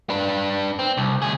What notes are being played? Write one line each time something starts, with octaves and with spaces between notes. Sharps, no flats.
D4 B4
C4
C2
D2 G#4